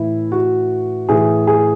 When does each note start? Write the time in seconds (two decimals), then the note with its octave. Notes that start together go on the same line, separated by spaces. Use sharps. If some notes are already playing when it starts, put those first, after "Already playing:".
Already playing: A2 E3 E4
0.32 F#4
1.09 A2 E3 G#4
1.47 G#4